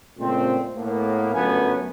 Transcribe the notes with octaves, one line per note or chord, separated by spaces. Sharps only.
A#2 C#3 G#3 A3 C4
A2 A#3 B3
G1 F#2 F#3 A3 B3 G#5